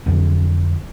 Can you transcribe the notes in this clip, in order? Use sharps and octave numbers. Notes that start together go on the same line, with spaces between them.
F2 D3 F#3